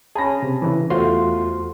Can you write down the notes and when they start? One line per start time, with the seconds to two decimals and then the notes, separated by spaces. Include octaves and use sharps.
0.15 C#4 G#4 A5 B5 A#6
0.43 C3
0.62 C#3 E3
0.90 E2 A3 F4 F#4 C5 C6